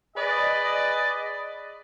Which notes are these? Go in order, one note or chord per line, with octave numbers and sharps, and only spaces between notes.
G#4 B4 D5 D#5